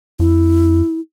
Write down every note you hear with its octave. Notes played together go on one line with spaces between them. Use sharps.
F2 E4